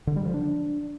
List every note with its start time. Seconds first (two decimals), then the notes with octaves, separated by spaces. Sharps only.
0.07 D3
0.16 G3
0.25 F3
0.34 D4